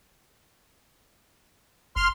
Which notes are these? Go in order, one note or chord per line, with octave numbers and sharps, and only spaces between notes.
F#1 C6 F6